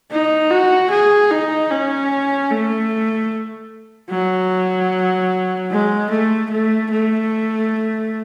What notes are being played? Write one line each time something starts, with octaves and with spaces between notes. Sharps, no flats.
D#4
F#4
G#4
D#4
C#4
A3
F#3
G#3
A3
A3
A3